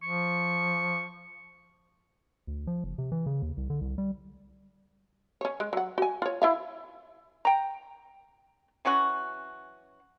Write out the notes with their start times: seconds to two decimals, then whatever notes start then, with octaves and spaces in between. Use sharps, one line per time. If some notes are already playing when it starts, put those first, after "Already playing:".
0.03 F3 C#6
2.47 D2
2.67 F3
2.84 F#1
2.98 C3
3.12 E3
3.26 C#3
3.42 D#2
3.57 C2
3.70 D3
3.81 C2
3.98 G3
5.41 C#4 C#5
5.60 G#3
5.73 F#3 F#5
5.98 F#4 G#5
6.22 F4 C#5
6.42 E4 E5 F5
7.45 G5 A#5
8.85 E3 F#3 C#4 F#4